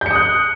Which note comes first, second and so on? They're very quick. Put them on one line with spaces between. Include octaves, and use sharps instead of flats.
G6 C#7 D#6 F#6